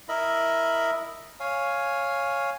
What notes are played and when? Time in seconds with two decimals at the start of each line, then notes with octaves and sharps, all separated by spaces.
0.09 E4 A#4 D#5 E5 B5
1.40 C#5 F5 G#5